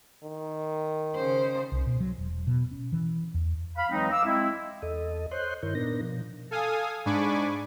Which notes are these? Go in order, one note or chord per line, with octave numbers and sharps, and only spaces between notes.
D#3
C#3 C5
C2
B2
F#3
E1
B2
C#4
E3
E2
F5 B5
E3 F#3 G#3 C4 D#4
F5 D6 E6
G#3 C4 E4
E2 A4 D#5
C5 C#5 D#5 C6 F#6 G6
G2 D#3 E4 A#4 C#5 G6
A#2 B3 D4 D#4 A#4 A#6
B2 F3
A4 F5 G#5 D#6
G#2 D4 G#5 B5 C#6 D6